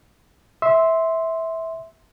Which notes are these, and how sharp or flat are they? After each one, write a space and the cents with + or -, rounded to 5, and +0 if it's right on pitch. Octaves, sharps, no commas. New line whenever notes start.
E5 -15 C6 +0